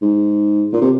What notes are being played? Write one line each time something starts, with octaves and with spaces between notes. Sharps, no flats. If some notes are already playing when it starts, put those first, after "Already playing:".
G#2
A#2
C3